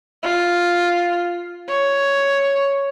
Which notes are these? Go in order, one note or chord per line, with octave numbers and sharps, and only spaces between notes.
F4
C#5